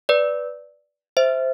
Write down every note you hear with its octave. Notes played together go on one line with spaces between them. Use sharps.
B4 D5
C5 E5